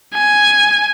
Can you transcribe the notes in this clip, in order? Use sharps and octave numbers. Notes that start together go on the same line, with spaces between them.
G#5